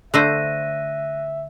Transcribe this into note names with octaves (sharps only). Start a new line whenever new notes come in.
D3 A3 C5 E5 F#6 A#6 D#7